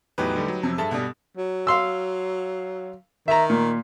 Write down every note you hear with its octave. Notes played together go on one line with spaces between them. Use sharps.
E2 A2 F#3 D#4 G4 B4
D3 G3 A3
F#3
F2 C3
G2 G#4 A4 E5 A5
B2 G3
F#3
F5 C6 E6
D#3 E5 A#5
A#2